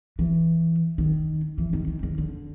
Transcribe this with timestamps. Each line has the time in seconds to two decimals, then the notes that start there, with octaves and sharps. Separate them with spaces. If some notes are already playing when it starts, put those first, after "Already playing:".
0.19 E3
0.98 D#3
1.58 E3
1.73 D#3
1.87 D#3
2.03 D#3
2.18 D3